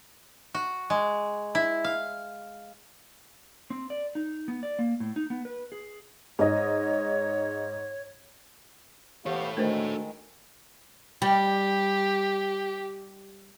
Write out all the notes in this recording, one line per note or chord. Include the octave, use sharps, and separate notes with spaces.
F#4
G#3
E4
F5
C4
D5
D#4
B3
D5
A#3
A2
D#4
B3
B4
G#4
G#2 C#5 D#5
E3 B3 G4 A4 C#5 F5
D2 D#3 G#3 A3 A#4 C5
G3 G4